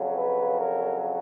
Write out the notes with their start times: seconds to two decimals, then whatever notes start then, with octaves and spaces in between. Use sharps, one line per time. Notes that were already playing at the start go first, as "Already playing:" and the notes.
Already playing: F2 C#3 F#3
0.15 B4
0.59 A#4